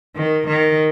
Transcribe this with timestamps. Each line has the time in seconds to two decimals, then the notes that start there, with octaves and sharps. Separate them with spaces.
0.16 D#3
0.48 D#3